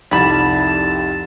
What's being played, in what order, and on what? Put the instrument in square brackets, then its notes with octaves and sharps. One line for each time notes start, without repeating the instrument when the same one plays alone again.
[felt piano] C2 F2 [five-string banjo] G3 B5 [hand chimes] D#4 E4 [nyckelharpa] A5